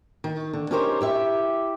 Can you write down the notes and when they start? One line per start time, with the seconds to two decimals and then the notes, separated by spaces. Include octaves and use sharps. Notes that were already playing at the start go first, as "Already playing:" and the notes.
0.24 D#3
0.53 D3
0.71 C#4 D#4 G4 A#4 C5 C#5
1.01 E4 G4 E5